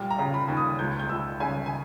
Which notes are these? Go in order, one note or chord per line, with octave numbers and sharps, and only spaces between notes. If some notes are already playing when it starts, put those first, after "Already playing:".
Already playing: A#2 G3
A#5
C#3
B5
D#2
D#6
C#2 G6
G6
C#2 E6
C#3 G#5
G#5